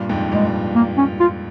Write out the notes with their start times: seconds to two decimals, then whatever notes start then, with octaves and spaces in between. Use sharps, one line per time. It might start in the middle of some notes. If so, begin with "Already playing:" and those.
Already playing: G2 A#2
0.09 F2 G#2
0.32 G2 A#2 G#3
0.75 A#3
0.97 C#4
1.20 F4